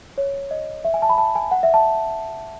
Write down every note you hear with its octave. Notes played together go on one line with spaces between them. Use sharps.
C#5
D#5
E5
G#5
A5
B5
A5
G#5
F#5
E5
A5